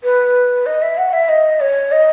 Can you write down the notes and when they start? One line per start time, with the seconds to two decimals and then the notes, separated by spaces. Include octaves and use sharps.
0.03 B4
0.66 D#5
0.82 E5
0.98 F#5
1.13 E5
1.29 D#5
1.60 C#5
1.92 D#5